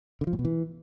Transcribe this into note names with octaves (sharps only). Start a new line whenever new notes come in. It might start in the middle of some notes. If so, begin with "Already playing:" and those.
D3
F3
A2
B2
E3